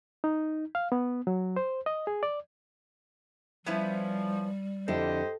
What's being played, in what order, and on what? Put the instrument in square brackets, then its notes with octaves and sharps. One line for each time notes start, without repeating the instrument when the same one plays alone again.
[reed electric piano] D#4
F5
B3
F#3
C5
D#5
G#4
D5
[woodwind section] F3 [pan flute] G3 [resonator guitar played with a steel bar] B3 C#4 E4
[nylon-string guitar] F2 D3 E4 [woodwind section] G4 C5 D#5 [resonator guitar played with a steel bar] A4